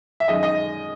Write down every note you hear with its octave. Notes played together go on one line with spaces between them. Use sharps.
E5
F#2 D#3 G#3 D#5
D#5